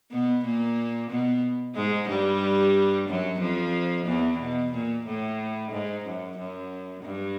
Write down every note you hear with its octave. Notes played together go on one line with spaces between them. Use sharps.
B2 B3
A#2 A#3
B2 B3
G#2 G#3
G2 G3
F#2 F#3
F2 F3
E2 E3
B2
A#2
A2
G#2
F#2
F#2
G2